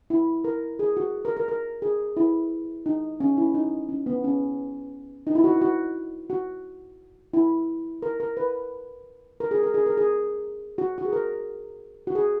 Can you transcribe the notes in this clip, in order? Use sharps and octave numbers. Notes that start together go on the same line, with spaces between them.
E4
A#4
G#4
F#4
A#4
A#4
A#4
G#4
E4
D#4
C#4
E4
D#4
C#4
B3
C#4
D#4
E4
F#4
E4
F#4
F#4
E4
A#4
A#4
B4
A#4
G#4
A#4
G#4
A#4
G#4
F#4
F#4
G#4
A#4
F#4
G#4